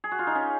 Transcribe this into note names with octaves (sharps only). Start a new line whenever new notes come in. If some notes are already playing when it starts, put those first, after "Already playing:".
G#4
F#4
F4
D#4
C#4